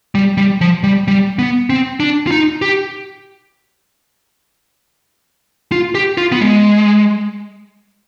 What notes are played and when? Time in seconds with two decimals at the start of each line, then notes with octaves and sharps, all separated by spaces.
0.15 G3
0.37 G3
0.61 F3
0.84 G3
1.08 G3
1.39 B3
1.70 C4
2.00 D4
2.27 F4
2.31 D#4
2.62 G4
5.72 F4
5.95 G4
6.18 F4
6.32 B3
6.41 G#3